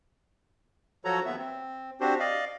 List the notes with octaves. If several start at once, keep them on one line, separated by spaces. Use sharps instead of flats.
F3 F#3 F#4 A4 C#5 A#5
D#2 B3 E5
C4
C4 D4 F#4 G4 C5
D5 D#5 F5